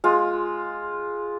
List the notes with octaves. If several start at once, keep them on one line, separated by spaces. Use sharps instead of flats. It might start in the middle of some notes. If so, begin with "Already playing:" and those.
G#3 F4